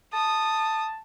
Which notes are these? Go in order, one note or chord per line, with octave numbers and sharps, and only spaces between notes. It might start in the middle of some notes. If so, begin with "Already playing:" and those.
A5 D#6